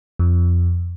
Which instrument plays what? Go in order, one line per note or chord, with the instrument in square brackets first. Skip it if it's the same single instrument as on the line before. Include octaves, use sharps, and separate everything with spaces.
[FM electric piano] F2